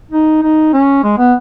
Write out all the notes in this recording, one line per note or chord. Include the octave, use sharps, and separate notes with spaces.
D#4
D#4
C#4
G#3
B3